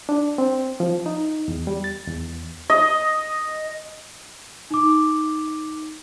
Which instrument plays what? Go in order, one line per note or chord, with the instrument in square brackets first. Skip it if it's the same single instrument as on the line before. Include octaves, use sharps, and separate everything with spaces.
[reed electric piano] D4
C4
F3
D#4
E2
G3
A6
E2
[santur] D#5
[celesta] D#4 D6